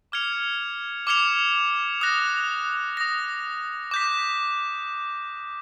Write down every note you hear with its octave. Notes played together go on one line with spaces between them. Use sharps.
D6 F6 G#6 C#7 F7
D6 F6 G#6 C#7 F7
D#6 F#6 A#6
D#6 F#6 A#6
D6 G6 B6